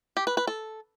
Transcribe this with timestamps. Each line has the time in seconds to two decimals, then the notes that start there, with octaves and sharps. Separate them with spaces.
0.17 G4
0.27 B4
0.37 B4
0.47 A4